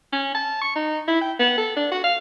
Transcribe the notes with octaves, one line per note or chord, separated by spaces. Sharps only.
C#4
A5
C#6
D#4
E4
G5
B3
A4
D4
F#4
F5